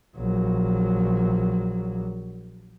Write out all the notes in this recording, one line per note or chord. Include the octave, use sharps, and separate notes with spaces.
A#1 F#3